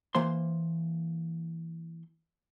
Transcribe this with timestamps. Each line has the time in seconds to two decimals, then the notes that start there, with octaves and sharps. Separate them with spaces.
0.15 E3 A#3 C5 C6